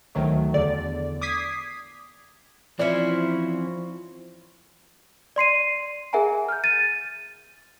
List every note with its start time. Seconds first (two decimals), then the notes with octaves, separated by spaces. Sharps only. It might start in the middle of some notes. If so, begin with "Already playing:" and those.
0.15 D2 D#3 F#3 A3
0.54 E2 D3 D5
1.21 D6 D#6 G#6 B6 C7
2.79 E3 F3 C4 C#4 E4 C5 D5
5.36 D5 C6 C7 D#7
6.13 G#4 A#4 E5 F#5 G#5 A#5
6.49 F6 G6
6.64 A6 D#7